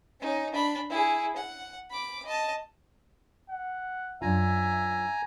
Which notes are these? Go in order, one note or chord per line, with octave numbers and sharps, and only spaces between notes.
C#4 D#4
D4 B5
E4 G#4
F#5
B5 D6
D#5 A5
F#5
F#2 D4 F4 E5 G#5 A#5